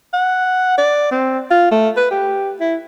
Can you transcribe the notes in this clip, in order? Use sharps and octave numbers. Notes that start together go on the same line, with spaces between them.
F#5
D5
C4
F4
A3
B4
G4
E4